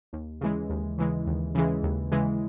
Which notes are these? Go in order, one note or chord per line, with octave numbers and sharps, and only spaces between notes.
D#2
C#3 E3 G#3
D#2
C#3 E3 G#3
D#2
C#3 E3 G#3
D#2
C#3 E3 G#3